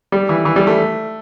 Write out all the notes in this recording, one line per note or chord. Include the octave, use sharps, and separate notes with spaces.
G3
E3
E3
G3
A3